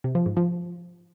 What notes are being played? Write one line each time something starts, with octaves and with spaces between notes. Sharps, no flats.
C3
F3
G#2
F3